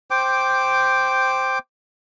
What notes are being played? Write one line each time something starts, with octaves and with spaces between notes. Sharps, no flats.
C5 G5 D6